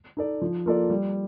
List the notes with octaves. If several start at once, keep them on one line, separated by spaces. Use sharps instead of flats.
D#4 A4 D5
F3
A#3 F4 A4 D5
G3